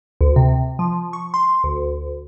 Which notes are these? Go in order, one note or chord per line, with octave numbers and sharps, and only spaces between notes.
D2
C3
F3
C#6
C6
D2